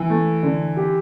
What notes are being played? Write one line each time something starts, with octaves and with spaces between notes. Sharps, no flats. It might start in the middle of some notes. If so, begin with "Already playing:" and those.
Already playing: E3
A3
D3
G4